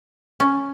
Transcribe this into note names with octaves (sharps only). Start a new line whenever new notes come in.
C#4